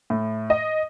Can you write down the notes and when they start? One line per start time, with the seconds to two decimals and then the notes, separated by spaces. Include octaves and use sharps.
0.10 A2
0.50 D#5